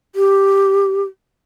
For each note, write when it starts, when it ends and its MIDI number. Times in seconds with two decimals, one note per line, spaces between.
0.15 1.04 67